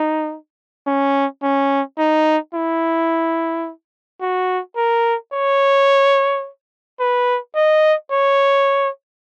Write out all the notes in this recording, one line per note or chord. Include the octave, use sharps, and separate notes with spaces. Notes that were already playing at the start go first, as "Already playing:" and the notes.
Already playing: D#4
C#4
C#4
D#4
E4
F#4
A#4
C#5
B4
D#5
C#5